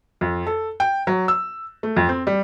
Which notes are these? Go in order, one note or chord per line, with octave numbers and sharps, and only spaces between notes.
F2
A4
G5
F#3
E6
A3
F2
C4
G3